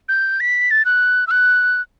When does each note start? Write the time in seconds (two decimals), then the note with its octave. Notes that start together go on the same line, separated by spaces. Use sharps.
0.09 G6
0.40 B6
0.71 A6
0.85 F#6
1.27 E6
1.31 F#6